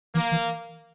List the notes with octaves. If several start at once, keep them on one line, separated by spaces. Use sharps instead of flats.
E3 A#3
E3